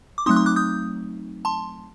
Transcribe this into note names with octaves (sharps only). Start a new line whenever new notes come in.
D6
F#3 A3 C4 D#4 C6 D#6 F#6
C6 D#6
D6 F#6
D#6 G6
A5 C6